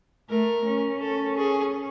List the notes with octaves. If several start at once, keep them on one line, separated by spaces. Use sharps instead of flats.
A3 A#4
C#4
A4
G#4